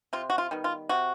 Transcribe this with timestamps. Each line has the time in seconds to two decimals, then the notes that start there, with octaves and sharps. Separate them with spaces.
0.13 C3 F4
0.30 F#4
0.38 F4
0.51 D#3 G3 B3
0.64 F4
0.89 C3 F#4